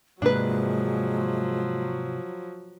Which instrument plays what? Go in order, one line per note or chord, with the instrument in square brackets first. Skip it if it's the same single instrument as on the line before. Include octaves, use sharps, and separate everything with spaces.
[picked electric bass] G#2 C3 A#3 [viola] F3 F#3 [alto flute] G#3 [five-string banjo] D4 B4